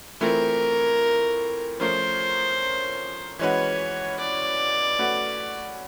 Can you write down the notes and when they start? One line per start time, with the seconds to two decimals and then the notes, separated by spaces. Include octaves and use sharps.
0.21 E3 A3 C4 F4 A#4
1.80 F3 A3 C#4 F4 A#4 C5
3.39 E3 G#3 C#4 F#4 B4 C#5
4.19 D5
4.99 A3 C#4 F#4 B4